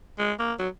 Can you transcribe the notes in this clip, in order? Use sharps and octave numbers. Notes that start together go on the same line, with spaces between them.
G#3
A#3
F#3